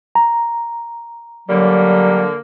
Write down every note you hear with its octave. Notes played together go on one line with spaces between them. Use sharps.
A#5
D3 F#3 G3 A#3